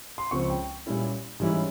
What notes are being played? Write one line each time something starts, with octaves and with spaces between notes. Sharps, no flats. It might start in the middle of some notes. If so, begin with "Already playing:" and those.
C6
C#2 C#3 F3 C4 C#6
G5
A#2 G3 C#4 E4
G#2 E3 G3 C#4 E4